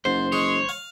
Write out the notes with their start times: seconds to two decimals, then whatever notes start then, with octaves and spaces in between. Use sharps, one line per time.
0.05 F#1 G#2 C5
0.32 G#3 G#4 C#5
0.69 F5